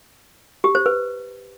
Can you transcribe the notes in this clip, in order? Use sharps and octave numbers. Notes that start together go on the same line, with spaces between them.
G4
C5
B4